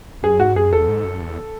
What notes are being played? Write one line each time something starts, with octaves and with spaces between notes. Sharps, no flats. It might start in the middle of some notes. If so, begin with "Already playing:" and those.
F#2 G#4
G#2 F#4
F#2 G#4
E2 A4
G#2
F#2
E2